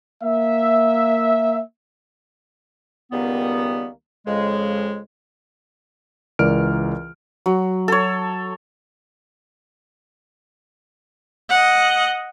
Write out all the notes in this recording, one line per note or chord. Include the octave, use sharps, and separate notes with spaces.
A#3 E5
C#2 D#3 G3 A#3 B3
F2 C#3 G#3
C#2 E3 A#4 D5 F6 D7
F#3
A4 C#5
D#5 F#5